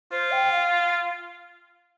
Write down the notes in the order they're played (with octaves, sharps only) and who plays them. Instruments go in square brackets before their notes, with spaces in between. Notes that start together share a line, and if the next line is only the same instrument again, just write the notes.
[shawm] F4 [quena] C5
[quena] G5
F5